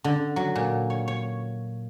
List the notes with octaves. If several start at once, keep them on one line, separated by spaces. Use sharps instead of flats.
D3
F#3
A#2
C#5
C#5